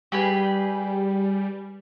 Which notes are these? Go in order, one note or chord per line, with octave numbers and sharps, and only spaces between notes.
G3 G4 G#4 B4